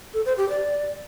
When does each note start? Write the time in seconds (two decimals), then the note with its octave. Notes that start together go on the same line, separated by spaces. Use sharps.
0.14 A4
0.26 C5
0.37 G4
0.49 D5